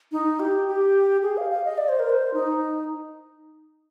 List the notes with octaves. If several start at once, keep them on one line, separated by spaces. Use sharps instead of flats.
D#4
G4
G4
G#4
F5
F5
D#5
D5
C5
A#4
C5
D#4